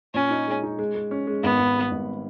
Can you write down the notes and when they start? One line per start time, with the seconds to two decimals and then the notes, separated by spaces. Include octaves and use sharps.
0.14 A#2 C#4
0.31 D#4
0.47 G#3
0.63 D#4
0.79 G#3
0.95 G#3
1.11 C#4
1.27 G#3
1.43 G#1 B3
1.59 G#1
1.75 G3
1.91 G#1